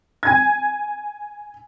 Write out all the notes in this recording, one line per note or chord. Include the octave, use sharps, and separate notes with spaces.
G#5 G#6